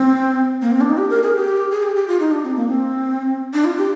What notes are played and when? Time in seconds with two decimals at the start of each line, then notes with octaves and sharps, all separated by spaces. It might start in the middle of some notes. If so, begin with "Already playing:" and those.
Already playing: C4
0.62 A#3
0.71 C4
0.81 D4
0.90 D#4
0.98 G4
1.10 A#4
1.23 G#4
1.35 G4
1.72 G#4
1.83 G4
1.96 G4
2.08 F4
2.20 D#4
2.31 D4
2.44 C4
2.56 A#3
2.69 C4
3.53 D4
3.65 F4
3.78 G4